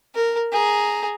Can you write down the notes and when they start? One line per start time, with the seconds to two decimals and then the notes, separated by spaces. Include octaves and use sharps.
0.15 A#4
0.52 G#4 A#5